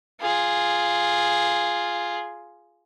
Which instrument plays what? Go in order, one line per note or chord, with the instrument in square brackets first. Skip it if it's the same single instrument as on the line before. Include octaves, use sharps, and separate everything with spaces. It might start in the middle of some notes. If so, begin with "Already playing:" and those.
[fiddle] F4 G#4